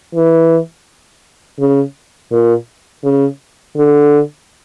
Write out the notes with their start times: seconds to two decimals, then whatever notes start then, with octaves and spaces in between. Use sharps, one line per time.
0.15 E3
1.59 C#3
2.32 A#2
3.04 C#3
3.76 D3